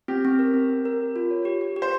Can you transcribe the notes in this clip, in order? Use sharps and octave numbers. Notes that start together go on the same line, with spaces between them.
C4 G4
C4
A#4
C4
C4
A#4
A#4
F4
C#5
G4
G4
G4
C5